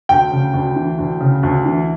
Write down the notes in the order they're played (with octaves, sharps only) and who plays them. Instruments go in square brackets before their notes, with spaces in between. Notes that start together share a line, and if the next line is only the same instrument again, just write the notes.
[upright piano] D2 [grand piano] G5
[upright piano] C#3
D2
E3
D2
C#3
D2
E3